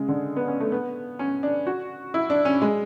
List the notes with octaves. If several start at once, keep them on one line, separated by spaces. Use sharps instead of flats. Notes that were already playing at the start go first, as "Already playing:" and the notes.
Already playing: C#3 G#3
D3
B3
C#4
A3
B3
C#4
D4
F#4
E4
D4
C#4
G#3